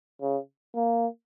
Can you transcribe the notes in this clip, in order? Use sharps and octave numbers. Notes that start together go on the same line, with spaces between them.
C#3
A#3